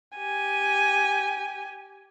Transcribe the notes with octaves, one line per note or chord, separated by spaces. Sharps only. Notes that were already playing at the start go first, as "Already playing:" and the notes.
G4 G#5